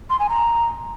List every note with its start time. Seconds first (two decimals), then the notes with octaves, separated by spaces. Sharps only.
0.10 C6
0.20 G#5
0.29 A#5